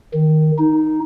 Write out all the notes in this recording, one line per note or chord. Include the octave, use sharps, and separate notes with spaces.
D#3
D#4